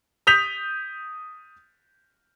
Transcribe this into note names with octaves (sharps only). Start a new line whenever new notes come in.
D#6 G6 B6 F7